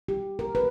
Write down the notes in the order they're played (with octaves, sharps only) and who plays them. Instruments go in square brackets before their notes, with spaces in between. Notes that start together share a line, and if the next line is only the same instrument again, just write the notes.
[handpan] G4
A#4
B4